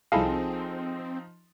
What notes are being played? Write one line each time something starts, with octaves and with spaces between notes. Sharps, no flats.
C2 F3 C4 D#4 E4 G#4 A4 F5